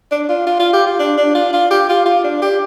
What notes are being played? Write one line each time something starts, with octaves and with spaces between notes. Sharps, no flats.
D4
F4
F4
F4
G4
F4
D4
D4
F4
F4
G4
F4
F4
D4
G4